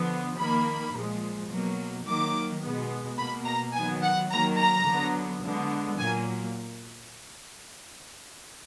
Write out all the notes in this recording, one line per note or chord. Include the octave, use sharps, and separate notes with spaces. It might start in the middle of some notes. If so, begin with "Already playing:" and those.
Already playing: D3 F3 B3
D#3 A#3 B5
A#2 F3 G#3
B2 F#3 A#3
D#3 F#3 A#3 D6
B2 G#3 B3
B2 A#3 B5
A#5
D#3 F#3 B3 G#5
F#5
D#3 F#3 A#3 A#5
A#5
D3 F#3 B3
D3 G#3 B3
A#2 F#3 A#3 G#5